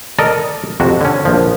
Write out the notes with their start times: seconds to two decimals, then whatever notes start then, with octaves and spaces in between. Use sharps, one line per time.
0.18 A4 A#4 D5 D#5 A5
0.80 F2 C3 F#4
1.01 D3 C#4
1.25 A#1 F3